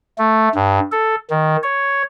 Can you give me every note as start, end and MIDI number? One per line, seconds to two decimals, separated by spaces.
0.18 0.49 57
0.55 0.80 43
0.92 1.15 69
1.30 1.57 51
1.63 2.03 73